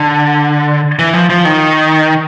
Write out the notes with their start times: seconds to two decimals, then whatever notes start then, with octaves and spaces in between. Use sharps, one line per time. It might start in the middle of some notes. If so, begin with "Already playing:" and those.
Already playing: D3
0.99 E3
1.14 F3
1.30 F3
1.45 D#3